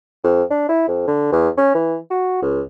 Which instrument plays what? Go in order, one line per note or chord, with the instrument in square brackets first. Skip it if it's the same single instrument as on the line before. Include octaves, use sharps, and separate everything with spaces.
[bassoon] F2
D4
E4
F2
D3
E2
C#4
E3
F#4
C#2